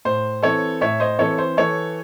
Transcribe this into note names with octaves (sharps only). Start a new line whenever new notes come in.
A2 C5
E3 C4 E4 A4 C#5
A2 C#5 E5
C5 D#5
E3 C4 E4 A4 C#5
C5
E3 A4 C#5